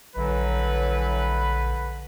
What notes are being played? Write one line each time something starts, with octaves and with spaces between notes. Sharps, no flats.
A#1 D3 E3 F#3 B4